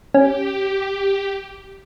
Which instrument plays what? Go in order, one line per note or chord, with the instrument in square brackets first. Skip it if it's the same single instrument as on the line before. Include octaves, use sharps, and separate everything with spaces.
[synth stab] C#4 [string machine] G4